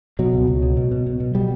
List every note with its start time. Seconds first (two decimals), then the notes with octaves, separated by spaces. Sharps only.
0.19 B2 F#3
0.33 C#2
0.47 C#2
0.62 B2
0.77 B2
0.91 B2
1.06 B2
1.20 B2
1.35 B2 G3